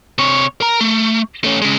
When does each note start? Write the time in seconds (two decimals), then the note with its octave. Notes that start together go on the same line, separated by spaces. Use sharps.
0.18 C3 C#5
0.61 A#4 A#5
0.81 A3
1.44 A3 C#4
1.62 C#3 G#3